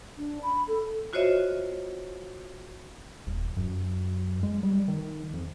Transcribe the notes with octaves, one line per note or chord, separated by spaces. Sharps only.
D4
B5
A4
F4 F#4 C5 C#5 D#5 E5
D#1
F#2
G#3
G3
D#3
F2